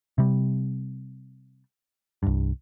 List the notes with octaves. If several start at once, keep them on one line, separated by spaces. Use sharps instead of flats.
C3 G3
C2 G2